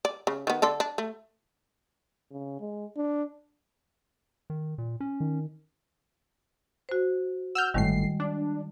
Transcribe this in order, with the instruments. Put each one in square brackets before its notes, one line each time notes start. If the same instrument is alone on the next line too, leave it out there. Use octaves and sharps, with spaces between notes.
[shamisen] D5
C#3
D#3 B3
D3 D4 A4
D4
A3
[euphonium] C#3
G#3
D4
[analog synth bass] D#3
A#2
C#4
[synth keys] D#3
[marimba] F#4 C5
[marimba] F#5 [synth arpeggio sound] E6 F6 G6
[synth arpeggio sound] G1 A2 C7 [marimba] D#3 G3 G#3
[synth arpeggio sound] D4